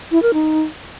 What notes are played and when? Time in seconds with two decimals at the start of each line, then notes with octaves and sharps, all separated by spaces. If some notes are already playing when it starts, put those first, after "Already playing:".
0.11 E4
0.23 A#4
0.34 D#4